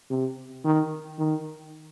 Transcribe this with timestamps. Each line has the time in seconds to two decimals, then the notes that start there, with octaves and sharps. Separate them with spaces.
0.10 C3
0.65 D#3
1.18 D#3